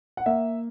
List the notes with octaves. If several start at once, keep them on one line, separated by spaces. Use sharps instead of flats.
F#5
A#3 E5